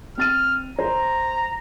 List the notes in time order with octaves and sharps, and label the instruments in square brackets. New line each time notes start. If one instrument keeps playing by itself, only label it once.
[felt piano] C4 A6 D#7 [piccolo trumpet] F6
[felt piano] C5 [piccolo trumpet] A#5